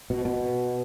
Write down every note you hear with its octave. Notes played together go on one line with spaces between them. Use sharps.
B2
B2